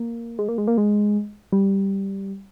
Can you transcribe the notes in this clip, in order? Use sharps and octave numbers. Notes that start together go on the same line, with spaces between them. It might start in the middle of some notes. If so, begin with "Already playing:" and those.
Already playing: A#3
G#3
A#3
G#3
A#3
G#3
G3